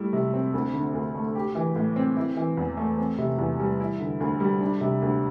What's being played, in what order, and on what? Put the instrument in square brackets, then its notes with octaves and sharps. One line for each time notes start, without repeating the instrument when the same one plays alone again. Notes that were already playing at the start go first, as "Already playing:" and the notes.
Already playing: [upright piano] G3 A3 E4
C3
C4
D2
D3
D2
A3
G4
E3
A2
C4
E4
E3
E2
A3
C4
C3
E2
G3
E4
D3
D2
G3
D4
C3
D2